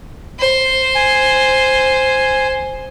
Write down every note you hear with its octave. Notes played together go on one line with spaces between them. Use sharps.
C5
G#5